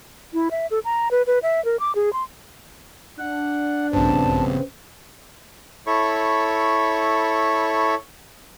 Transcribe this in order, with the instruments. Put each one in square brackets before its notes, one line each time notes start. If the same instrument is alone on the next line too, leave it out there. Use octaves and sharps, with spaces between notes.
[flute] E4
E5
A4
A#5
B4
B4
E5
A#4
D6
G#4
C6
[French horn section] D4 [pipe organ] F#5
[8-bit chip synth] A#1 G2 [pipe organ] C#3 B3 C4 [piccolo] A5
[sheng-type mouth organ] E4 A4 C#5 B5 C#6